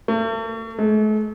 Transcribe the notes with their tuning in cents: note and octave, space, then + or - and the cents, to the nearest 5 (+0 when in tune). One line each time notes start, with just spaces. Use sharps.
A3 +40
A3 -45